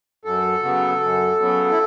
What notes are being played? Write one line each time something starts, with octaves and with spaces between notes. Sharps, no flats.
F#2 A4
C#3 F#3 B3
F#2
C#3 F#3 B3
E4